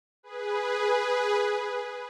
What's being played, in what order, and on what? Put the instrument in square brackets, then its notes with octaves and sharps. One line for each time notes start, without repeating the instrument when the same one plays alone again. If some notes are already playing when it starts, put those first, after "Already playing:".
[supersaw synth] G#4 B4